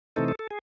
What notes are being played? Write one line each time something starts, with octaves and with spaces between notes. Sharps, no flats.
C3 E3 A3 C4 D#4 A4
A4
A4
G#4